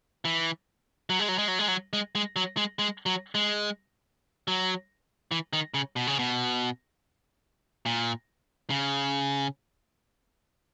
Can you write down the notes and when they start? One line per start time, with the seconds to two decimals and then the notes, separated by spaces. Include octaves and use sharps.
0.25 E3
1.10 F#3
1.19 G#3
1.28 F#3
1.38 G#3
1.48 F#3
1.59 G#3
1.68 F#3
1.93 G#3
2.15 G#3
2.36 F#3
2.57 G#3
2.79 G#3
3.06 F#3
3.35 G#3
4.48 F#3
5.31 E3
5.53 D#3
5.74 C#3
5.96 B2
6.07 C#3
6.19 B2
7.86 A#2
8.70 C#3